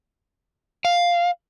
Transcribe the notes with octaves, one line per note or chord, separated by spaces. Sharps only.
F5